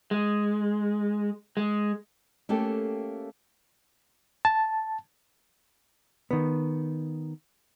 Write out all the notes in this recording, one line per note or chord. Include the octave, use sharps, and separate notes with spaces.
G#3
G#3
A3 A#3 C#4 G4 A4 G5
A5
D#3 B3